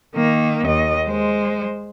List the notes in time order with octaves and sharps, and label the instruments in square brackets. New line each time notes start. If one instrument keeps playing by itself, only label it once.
[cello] D#3 A#3
D#2 D#5
G#3 C5